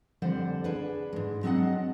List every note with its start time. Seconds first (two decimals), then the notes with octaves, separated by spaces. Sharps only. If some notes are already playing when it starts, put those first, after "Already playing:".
0.22 F2 D3 G3 C5 D5 F#5
0.64 D4 G#4 B4
1.13 G#2 G#3
1.43 F#3 G#3 C4 D4 D#5 F#5